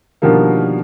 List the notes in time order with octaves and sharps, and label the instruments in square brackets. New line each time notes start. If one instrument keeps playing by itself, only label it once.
[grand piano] B2 D3 D#3 F3 G3 A#3